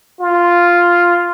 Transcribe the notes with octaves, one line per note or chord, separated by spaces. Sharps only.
F4